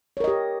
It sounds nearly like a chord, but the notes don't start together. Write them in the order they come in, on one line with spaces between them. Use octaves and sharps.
C#5 A#4 D#5 G4